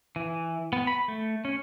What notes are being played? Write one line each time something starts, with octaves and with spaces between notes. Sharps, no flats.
E3
B3
B5
A3
C#4